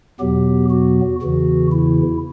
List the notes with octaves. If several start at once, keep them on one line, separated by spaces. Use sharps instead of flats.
E2 B2 F#3 B3 G4
F#4
E2 C#3 E3 F#4
E4